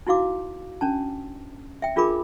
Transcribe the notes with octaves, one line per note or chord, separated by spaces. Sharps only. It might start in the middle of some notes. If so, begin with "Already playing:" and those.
D#4 E4 F#4 F5 D6
C#4 D4 A5
E5 G5
D4 F4 G#4 A#4 B5 D6